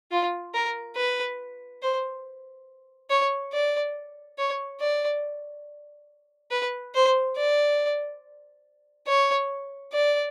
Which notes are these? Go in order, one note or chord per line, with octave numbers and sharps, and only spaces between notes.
F4
A#4
B4
C5
C#5
D5
C#5
D5
B4
C5
D5
C#5
D5